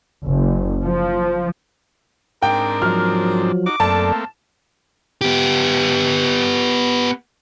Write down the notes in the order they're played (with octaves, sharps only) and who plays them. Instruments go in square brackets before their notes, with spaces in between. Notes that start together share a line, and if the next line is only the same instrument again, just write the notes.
[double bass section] F#1
F3
[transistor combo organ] G#2 C4 D4 [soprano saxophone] A#4 [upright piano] G5
[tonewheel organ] F3 F#3 [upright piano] F6
[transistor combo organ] D#4 F#4 [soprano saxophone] D6
[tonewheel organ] F#2 A4 D5 [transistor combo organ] A3 A#3 C4 [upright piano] A5
[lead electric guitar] B3 G4